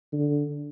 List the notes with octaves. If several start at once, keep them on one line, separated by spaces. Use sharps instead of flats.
D3